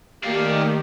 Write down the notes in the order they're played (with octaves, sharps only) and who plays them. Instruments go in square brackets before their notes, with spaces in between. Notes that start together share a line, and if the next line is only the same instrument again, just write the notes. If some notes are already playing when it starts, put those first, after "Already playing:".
[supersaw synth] D#3 [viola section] A3 A#3 G4 [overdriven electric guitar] D5 F5